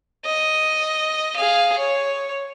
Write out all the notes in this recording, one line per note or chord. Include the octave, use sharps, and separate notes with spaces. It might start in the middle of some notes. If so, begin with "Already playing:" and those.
D#5
G#4 F5
C#5